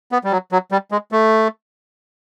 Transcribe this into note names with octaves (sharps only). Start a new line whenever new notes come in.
B3
G3
F#3
F#3
G3
G#3
A3